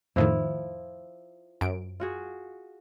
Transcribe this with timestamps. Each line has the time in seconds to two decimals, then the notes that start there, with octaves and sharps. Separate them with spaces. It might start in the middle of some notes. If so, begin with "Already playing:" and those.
0.16 F2 A2 D#3 F3 E4
1.61 F#2 D7
2.00 F4 F#4 G#4